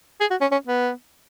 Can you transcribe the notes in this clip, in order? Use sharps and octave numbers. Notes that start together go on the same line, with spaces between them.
G#4
F#4
C#4
C#4
B3